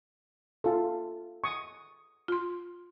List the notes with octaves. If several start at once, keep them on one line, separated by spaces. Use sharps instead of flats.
F4 A4
C#6 D#6
F4 C6